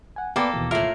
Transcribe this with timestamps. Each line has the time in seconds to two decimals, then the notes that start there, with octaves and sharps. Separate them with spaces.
0.16 F#5 G#5
0.36 A#3 B3 A4 D5 G5 B5 D6
0.53 D#2 B2 E3
0.71 A2 F4 A#4 E5